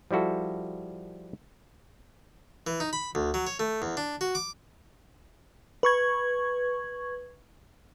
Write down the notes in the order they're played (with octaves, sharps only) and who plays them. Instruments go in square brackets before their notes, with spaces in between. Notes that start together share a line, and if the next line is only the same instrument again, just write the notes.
[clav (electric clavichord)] F3 G3 E4 F#4 A4
[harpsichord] E3
D#4
B5
D2
F#3
C#5
A3
E2
D4
F#4
D6
[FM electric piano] B4 C#6 G#6